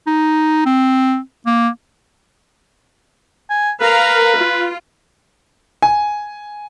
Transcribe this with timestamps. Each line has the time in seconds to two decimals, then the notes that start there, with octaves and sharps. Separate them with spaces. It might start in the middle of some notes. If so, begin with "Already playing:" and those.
0.07 D#4
0.66 C4
1.46 A#3
3.50 G#5
3.81 A#4 B4 F5 A#5
4.36 F4
5.82 G#5